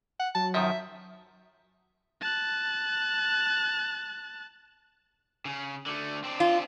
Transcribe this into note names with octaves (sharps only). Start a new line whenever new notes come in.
F#5
F#3 A5
F#2 D#3 F3 E5
A5 F#6
C#3
D3 A3
C4 D4
F4